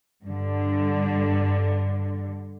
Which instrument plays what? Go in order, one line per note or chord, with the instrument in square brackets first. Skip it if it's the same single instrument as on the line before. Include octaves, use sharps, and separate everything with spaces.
[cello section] G2 D3